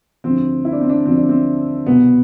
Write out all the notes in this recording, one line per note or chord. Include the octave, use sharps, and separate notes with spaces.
D2 D3 F3 C4
E4
D4
C4
D4
D2 D3 F3 C4
D4
C4
C2 B2 B3